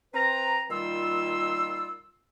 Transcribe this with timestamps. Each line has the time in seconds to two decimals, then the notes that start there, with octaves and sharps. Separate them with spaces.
0.14 C4 B4 A#5
0.70 A#2 D#3 G3 F4 C6 E6